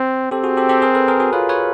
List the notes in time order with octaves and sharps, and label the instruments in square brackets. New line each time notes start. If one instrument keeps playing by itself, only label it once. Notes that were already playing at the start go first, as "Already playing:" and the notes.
Already playing: [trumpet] C4
[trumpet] C4 [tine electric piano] G4 A4
[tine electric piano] F#4 G#4
G4 A4
G4 A4
G#4 A#4
A4 B4
G#4 A#4
F#4 G#4
[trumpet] F4 [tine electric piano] B4 C#5
[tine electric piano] B4 C#5